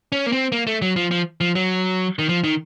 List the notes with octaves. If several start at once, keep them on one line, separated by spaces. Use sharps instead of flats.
C#4
A#3
C4
A#3
A3
F#3
F3
F3
F3
F#3
D#3
F3
D#3